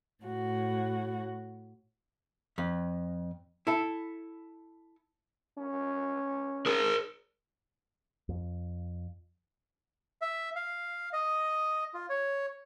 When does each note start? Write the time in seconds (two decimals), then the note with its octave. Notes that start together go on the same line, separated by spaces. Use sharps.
0.23 A2 F#4
2.58 F2
3.67 E4 A4
5.58 C#4
6.66 G#4 A#4
8.29 F2
10.21 E5
10.56 F5
11.13 D#5
11.94 F4
12.09 C#5